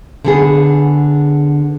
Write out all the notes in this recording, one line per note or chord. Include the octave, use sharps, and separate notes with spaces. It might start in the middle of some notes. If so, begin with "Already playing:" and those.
D3 B3 G#4